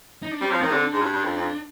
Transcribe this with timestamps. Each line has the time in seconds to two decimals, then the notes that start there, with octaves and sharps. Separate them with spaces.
0.22 D#4
0.31 D4
0.41 G3 C4
0.51 F3
0.62 D#3 C4
0.72 D3
0.83 D4
0.93 G#2
1.02 G2
1.13 G2
1.24 F2
1.37 F2